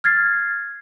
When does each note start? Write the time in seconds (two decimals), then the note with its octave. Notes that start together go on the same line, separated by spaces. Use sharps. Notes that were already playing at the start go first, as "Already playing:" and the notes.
0.04 F6 G#6 A6 C7